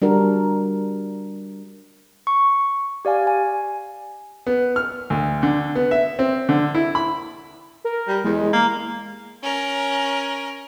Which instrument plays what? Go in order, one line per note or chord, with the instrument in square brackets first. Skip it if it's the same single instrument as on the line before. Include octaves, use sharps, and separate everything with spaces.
[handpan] G3 D4 F#4 A#4
[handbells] C#6
G4 D5 F5 G#5
G#5
[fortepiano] B3
F6
D2
D3
B3
E5
C4
D3
E4
B5
[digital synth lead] A#4
[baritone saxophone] G3
[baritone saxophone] E2 [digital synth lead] G#3
[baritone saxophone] A#3
[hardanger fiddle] C#4 A#4